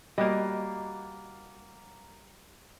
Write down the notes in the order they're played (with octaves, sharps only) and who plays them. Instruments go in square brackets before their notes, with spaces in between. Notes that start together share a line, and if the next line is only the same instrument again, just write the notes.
[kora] G3 [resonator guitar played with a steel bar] A#3 F#4 D#5